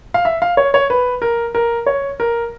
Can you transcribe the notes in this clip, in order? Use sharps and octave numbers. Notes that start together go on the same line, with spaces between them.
F5
E5
F5
C#5
C#5
B4
A#4
A#4
C#5
A#4